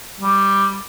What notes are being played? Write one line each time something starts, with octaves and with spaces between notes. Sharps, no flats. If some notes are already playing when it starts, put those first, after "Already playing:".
G3